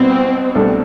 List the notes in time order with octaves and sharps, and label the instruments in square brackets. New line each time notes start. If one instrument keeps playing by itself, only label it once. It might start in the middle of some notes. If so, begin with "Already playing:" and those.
Already playing: [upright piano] B2 G3 B3 E4 [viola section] C4
[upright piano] C2 B2 A3 D4 A4